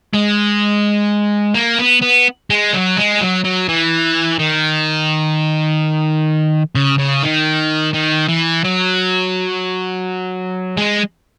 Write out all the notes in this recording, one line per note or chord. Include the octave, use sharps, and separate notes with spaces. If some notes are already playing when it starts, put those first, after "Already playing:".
G#3
A#3
B3
B3
G#3
F#3
G#3
F#3
F#3
E3
D#3
C#3
C#3
D#3
D#3
E3
F#3
G#3